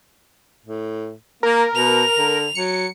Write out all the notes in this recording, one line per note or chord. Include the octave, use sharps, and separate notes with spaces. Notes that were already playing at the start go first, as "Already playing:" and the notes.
A2
A#3 A#4
B2 F7
D3
F#3 C#7